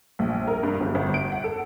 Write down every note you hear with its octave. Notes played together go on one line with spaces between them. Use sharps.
A#1
A#4
G2
G1
G1
D7
F#5
A4